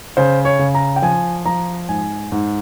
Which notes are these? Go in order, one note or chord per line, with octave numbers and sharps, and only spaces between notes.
C#3 C5
C#5
C#3
A#5
G5
F3 G#5
F3 A#5
G#2 G#5
G#2